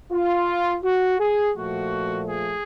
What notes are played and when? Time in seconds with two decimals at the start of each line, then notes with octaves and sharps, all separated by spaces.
0.11 F4
0.84 F#4
1.20 G#4
1.56 A#2 F3 A3 F#4
2.27 G#4